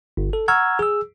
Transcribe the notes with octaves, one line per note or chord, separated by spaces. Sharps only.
G1
A4
F#5 A#5 C#6 E6 F6 G#6
G#4 E6